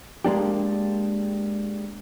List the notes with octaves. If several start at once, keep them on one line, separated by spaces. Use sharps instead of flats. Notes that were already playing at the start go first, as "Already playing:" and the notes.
G#3 A#3 D4 G4